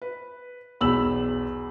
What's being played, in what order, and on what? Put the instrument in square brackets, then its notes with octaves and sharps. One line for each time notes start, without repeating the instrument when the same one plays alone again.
[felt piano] B4
[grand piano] B1 E6 F#7 [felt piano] E2 B5